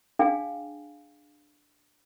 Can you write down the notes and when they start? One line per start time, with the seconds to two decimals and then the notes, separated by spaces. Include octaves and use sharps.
0.19 D4 G#4 F5 G5 G#5